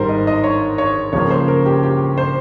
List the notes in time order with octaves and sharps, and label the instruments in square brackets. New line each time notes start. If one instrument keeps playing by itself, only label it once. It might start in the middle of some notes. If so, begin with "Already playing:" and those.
Already playing: [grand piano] G#1 G#2 G3 A#4 C5
D#5
D#5
C#5
C#5
C#2 C#3 F3 A#3 C#5
C5
A#4
G4
G4
C5